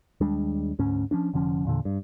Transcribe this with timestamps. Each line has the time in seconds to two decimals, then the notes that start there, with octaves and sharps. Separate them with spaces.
0.20 D#2 G3 G#3 D4
0.79 D2 G#2 C#4
1.11 F3 C#4 D4
1.33 F1 D3 F3 C#4
1.65 E2 A#2 D3
1.85 G2